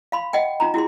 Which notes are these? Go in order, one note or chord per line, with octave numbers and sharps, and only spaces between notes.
F5 B5 C6
D#5 F#5 G5
D#4 F4 A#5
E4 F#4 G#4 C6